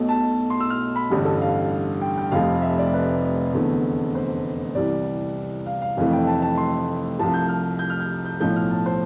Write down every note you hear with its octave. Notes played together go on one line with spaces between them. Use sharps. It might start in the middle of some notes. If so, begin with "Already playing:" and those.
Already playing: B1 B2 A3
A5
C6
E6
F6
B5
A1 G2 D3 G3
A4
F5
G5
G5
F1 F2 C3 F3 A3 F5
E5
D5
B4
F1 E2 D3 A3
C5
C2 C3 E3 G3 D5
F5
F5
F1 F2 E3 A3 F5
G5
A5
A5
C6
C2 C3 F3 A3 A5
G6
F6
G6
F6
G6
G6
B1 A2 F3 A3 G6
F6
A5
C5